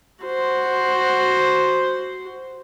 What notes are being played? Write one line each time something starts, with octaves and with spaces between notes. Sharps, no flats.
F#4 C5